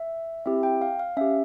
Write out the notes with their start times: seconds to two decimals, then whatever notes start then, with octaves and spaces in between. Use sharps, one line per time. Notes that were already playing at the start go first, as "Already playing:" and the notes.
Already playing: E5
0.46 C4 E4 G4 E5
0.63 G5
0.82 F5
0.99 F5
1.17 C#4 G4 E5